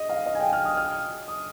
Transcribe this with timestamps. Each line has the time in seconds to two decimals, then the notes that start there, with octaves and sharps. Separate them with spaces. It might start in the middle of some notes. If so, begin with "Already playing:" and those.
Already playing: D#5
0.09 F5
0.26 D#5
0.35 G#5
0.40 G5
0.53 F6
0.65 D#6
0.77 F6
1.28 D#6